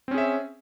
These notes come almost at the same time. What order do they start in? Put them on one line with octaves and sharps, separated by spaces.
C4 C#4 G#4 E5